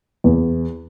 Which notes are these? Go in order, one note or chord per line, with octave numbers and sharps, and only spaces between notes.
E2